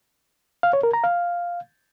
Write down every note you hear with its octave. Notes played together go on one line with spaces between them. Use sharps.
F5
C#5
A#4
A#5
F5